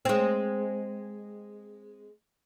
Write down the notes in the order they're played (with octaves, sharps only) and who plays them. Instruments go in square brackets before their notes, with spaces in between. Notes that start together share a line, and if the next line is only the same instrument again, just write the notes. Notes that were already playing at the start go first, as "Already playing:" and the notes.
[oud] G#3 C4